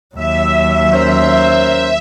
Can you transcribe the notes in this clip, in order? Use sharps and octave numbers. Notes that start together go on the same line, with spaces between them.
D#2 F#3 E5
C#4 A#4 C5